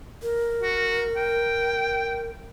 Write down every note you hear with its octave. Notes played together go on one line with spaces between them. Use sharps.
A#4
F#4
G5